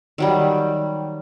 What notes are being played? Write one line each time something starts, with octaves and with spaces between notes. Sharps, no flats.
D#3 F#3 G3